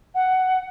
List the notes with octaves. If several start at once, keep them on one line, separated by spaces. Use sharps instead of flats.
F#5